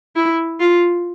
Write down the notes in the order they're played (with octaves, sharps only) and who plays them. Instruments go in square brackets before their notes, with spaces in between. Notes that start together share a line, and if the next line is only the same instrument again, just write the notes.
[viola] E4
F4